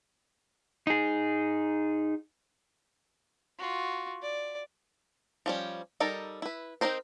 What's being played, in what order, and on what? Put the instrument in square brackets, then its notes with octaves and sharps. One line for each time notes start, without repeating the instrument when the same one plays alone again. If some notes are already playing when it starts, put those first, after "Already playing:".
[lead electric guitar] D#4 G#4
[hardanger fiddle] F4 F#4
D5
[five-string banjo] F3 G3 C#4
G3 D#4 A4 A#4
E4 B4
C4 D4 D#4 A#4 C5